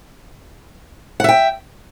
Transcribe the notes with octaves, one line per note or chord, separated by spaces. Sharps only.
E5 F#5 G5